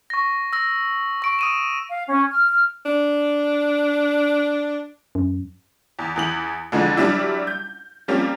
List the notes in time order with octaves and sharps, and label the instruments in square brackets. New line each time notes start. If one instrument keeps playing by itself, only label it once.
[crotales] C#6 A#6
E6 A#6
C#6 D7
D#6 D#7 E7
[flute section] F5
C#4
F6
[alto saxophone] D4
[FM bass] F#2
[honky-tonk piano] E2
E2 E3 F#7
F2 D3 E3 F3 G#3
F#3 G3 D4 E4
G6
F3 G3 A#3 C4 C#4